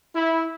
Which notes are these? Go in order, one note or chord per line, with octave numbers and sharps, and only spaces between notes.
E4